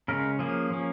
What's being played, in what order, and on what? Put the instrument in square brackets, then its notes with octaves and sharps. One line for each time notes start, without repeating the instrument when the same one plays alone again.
[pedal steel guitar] C#3 G#3 C#4 A#4
F3 A#3 C#4 G#4
F3 A#3 C#4